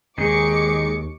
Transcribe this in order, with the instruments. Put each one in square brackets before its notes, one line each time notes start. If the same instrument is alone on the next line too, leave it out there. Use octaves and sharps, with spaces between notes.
[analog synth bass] D#2 [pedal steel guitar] D#3 D#4 G#4 [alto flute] G#3 [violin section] C#6 D6 C#7